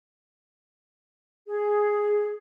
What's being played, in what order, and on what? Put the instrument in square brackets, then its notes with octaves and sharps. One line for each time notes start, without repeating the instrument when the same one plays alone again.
[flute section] G#4